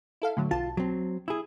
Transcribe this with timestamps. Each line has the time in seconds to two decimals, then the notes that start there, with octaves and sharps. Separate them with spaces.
0.22 E4 A4 F5
0.37 A2 D3 F#3
0.51 B1 F4 A5
0.77 F#3 C4
1.28 E4 G#4